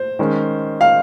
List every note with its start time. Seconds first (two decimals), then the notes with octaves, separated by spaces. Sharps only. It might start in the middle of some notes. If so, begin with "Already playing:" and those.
Already playing: C5
0.19 D#3 G#3 C#4
0.81 F5